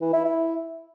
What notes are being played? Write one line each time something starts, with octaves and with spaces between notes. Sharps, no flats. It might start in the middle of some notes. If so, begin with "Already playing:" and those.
E3
E4
E4